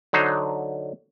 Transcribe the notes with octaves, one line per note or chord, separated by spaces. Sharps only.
D3 F#3 D#4 C5